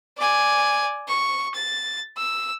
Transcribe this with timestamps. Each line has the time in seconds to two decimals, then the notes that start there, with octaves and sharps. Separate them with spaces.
0.18 D5 G#5
1.08 C#6
1.55 A6
2.17 E6